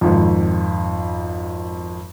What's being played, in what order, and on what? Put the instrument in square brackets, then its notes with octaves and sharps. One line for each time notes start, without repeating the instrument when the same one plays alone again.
[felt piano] G#1 F2